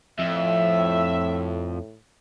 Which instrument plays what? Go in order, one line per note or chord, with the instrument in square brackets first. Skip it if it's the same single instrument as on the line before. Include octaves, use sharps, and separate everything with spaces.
[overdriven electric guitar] F2 [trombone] A2 [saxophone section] E5